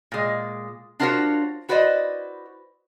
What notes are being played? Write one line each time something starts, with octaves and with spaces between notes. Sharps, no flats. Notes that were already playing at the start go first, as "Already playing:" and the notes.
A#2 G#3
D4 F4 F#4 A#4 C5 C#5
E4 F#4 B4 C5 D5 D#5